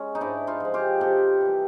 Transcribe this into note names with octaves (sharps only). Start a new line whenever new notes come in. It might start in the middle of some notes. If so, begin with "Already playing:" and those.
Already playing: G#3 C#4
D#4
G#2 D4 E4
D#4 F4
F3 G#3
F4 G4
C3 G4 A4
E3 G3